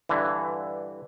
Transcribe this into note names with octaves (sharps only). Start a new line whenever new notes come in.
G2 D3 E3